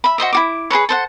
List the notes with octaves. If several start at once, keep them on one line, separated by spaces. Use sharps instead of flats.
E5 B5
F#4 C5 D#5 E5
E4 F#4 D6
G#4 A#4 B4 C#5
A4 C5 F#5